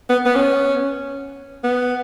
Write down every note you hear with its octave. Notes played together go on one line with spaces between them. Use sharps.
B3
B3
C#4
B3